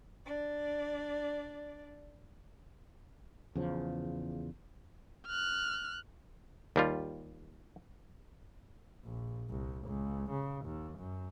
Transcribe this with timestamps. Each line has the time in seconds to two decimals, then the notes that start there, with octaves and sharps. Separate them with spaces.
0.25 D4 D5
3.55 E2 C#3 F3
5.27 F6 F#6
6.76 D#2 G3 F4
9.04 A#1
9.50 C2
9.86 C#2
10.30 C#3
10.65 D#2
10.98 F#2